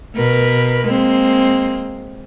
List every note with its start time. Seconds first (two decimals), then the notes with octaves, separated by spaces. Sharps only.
0.15 B2 A#4 B4
0.86 G#3 A#3 C4